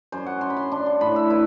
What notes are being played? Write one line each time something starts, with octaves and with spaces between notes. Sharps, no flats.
F#2 C5
F#5
F#2 C6
B5
C6
D4 C6
C6
A2 B5
E5
E4 B4